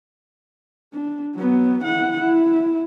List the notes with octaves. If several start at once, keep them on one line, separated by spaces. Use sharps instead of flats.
D4
F#3 B3
E4 F#5
E4